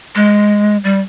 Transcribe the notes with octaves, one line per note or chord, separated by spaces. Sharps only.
G#3
G3